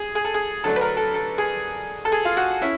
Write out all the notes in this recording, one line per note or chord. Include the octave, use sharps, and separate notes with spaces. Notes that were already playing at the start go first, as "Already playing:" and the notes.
Already playing: G#4
G#4
A4
G#4
D3 F#3 A3 D4 A4
B4
A#4
A4
A4
G#4
A4
G#4
F4
F#4
C#4 E4